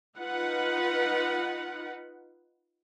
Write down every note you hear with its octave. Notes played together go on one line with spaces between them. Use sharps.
D#4 F4 B4 F#5